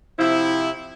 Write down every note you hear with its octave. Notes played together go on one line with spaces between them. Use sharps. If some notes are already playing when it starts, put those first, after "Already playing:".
C3 F3 E4